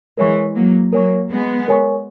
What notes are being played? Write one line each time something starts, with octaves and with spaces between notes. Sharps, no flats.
E3 G#3 A#4 C#5 G#5 C#6
F#3 A#3
F#3 A#3 A#4 C#5 G#5 C#6
G#3 B3
A#4 C#5 G#5 C#6